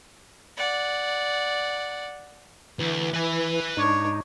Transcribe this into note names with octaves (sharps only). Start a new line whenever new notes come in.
D5 F#5
D2 E3
E4 B4 G#5
G#2 D4 D#4 C#5